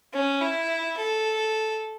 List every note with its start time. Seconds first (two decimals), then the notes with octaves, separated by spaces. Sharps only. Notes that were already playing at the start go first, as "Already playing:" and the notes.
0.13 C#4
0.41 E4
0.97 A4